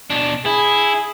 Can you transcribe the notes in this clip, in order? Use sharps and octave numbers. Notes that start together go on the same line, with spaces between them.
B2 D4
E4 G#4